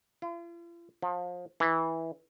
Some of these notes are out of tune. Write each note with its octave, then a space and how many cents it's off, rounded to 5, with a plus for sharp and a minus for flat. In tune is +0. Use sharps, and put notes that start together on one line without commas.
F4 -45
F3 +30
E3 -15